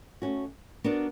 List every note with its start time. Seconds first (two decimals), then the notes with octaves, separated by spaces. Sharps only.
0.22 A3 C#4 F#4
0.84 B3 D4 F#4 A#4 D5